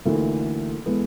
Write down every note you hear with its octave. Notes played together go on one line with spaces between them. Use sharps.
D2 E3 A#3 D#4 A4
E3 G#3 B3 A4